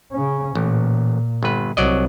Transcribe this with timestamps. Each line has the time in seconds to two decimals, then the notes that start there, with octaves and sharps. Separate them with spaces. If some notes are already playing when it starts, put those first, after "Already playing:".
0.12 C#3 C#4
0.55 A1 A#2
1.43 G1 B4
1.77 C2 F#3 D5 D#5